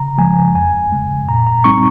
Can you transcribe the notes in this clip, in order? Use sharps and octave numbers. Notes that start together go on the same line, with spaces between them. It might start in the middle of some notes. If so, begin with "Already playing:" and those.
Already playing: C#3 A#5
F3 G#3 G#5
F2 G#5
C#3 G#3
A#2 A#5
A#5
G3 C4 D#4 C#6